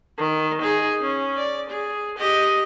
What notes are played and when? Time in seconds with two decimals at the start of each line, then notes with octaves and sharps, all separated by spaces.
0.18 D#3
0.62 D#4 G#4
1.01 C#4
1.37 D5
1.70 G#4
2.17 G4 D#5